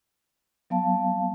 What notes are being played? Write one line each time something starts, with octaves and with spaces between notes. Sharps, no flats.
F#3 B3 F5 A5